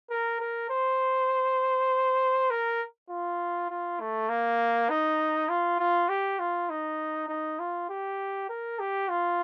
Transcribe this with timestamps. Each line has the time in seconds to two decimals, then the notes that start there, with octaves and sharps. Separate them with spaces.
0.10 A#4
0.40 A#4
0.70 C5
2.51 A#4
3.10 F4
3.70 F4
4.00 A3
4.29 A#3
4.90 D#4
5.49 F4
5.79 F4
6.09 G4
6.39 F4
6.70 D#4
7.29 D#4
7.59 F4
7.89 G4
8.49 A#4
8.79 G4
9.09 F4